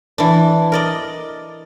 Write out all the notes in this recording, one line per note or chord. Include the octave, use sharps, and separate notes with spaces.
E3 D4
A#4 D5 D#5